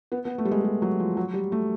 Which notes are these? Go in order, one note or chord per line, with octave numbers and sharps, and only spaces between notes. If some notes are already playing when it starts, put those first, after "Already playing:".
B3
B3
A3
G3
G#3
G3
F#3
F3
F#3
G3
A3